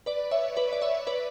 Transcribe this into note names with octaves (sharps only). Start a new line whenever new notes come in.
B4 D5
C#5 E5
B4 D5
D5
C#5 E5
B4 D5